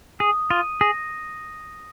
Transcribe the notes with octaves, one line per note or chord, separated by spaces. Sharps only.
G#4 D#6
F4 D#7
G#4 A#6